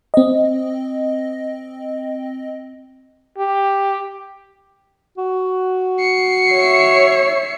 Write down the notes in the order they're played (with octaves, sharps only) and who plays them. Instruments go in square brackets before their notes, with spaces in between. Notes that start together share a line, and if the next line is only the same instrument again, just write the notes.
[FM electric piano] C4 D#5
[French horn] G4
[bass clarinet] F#4
[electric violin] C7 C#7
[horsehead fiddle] C#5 E5